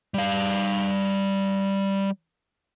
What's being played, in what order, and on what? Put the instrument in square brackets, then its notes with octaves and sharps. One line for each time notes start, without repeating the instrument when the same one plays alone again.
[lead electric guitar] G3 F5